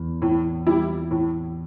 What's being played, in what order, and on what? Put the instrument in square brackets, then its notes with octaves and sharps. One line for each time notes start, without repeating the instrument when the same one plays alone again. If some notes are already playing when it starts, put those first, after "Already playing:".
Already playing: [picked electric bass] E2
[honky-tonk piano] A2
G3 E4
A2